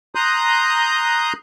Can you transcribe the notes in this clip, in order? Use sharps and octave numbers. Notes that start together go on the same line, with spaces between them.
A#5 C6 D#6 F#6 G6